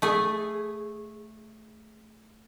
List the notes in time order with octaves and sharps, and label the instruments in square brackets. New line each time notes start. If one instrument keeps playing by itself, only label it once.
[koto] A3 G#4